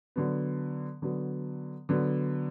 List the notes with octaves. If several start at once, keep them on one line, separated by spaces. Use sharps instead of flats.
D3 F#3 B3
D3 F#3 B3
D3 F#3 B3